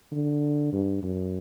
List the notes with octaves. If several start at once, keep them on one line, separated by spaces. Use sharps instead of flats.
D3
G2
F#2